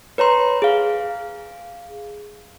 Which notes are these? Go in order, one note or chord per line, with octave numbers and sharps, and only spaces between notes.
B4 C#5 A#5 C6
G#4 F5